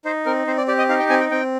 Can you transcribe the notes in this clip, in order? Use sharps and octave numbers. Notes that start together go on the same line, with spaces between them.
D#4 C5
C4 A#4
C4 C5
D5
G4 D5
D#5
D#4 F5
G5
C4 G#5
G5
C4 G5